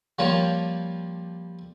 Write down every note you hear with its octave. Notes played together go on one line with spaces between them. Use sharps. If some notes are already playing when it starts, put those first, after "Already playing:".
F3 G3 A#3 F4 C#5 A5